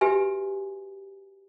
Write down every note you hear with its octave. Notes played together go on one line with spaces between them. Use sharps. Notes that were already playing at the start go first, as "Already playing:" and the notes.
F#4 G4 B4 E5 G#5